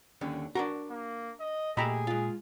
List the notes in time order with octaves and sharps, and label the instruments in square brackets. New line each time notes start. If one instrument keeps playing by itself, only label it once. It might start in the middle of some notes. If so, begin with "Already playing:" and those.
[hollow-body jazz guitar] D#2 D3 C#4
[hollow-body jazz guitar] D4 A#4 A#5 [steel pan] F#4
[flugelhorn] A#3
D#5
[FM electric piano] A#2 [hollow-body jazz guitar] A3 G4 E5 [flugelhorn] G#4 [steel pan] D#5 A#5 B5
[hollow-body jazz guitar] G#3 F4